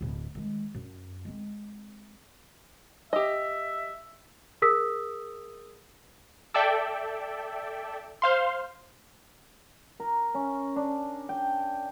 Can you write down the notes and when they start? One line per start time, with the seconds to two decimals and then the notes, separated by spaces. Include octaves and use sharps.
0.01 D1 D3
0.35 D#3 G#3
0.75 F#2
1.25 G#3 C4
3.13 G4 D#5 E5
4.62 G#4 A#4 D#6 E6 B6
6.54 A4 D5 E5 G5
8.22 C5 F5 C6
10.00 A#4
10.34 C#4
10.76 D4
11.29 G5